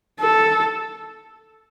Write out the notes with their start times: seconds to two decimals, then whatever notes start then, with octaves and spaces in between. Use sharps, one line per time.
0.20 A4